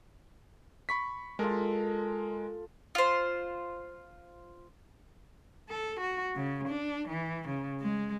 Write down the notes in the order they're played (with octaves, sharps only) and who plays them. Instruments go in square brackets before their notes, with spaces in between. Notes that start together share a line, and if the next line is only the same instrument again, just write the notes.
[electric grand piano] B5 C#6 B6
[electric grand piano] G#3 A#4 [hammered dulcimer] F4 A4
[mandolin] F4 C5
[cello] A4
F#4
C#3
D4
E3
C#3
G#3